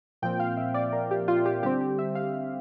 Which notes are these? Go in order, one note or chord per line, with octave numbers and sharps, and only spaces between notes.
A#2 F3 C4 G5
F5
E5
D5
A#4
G4
F4
G4
D3 G3 C4 G4
G4
E5
F5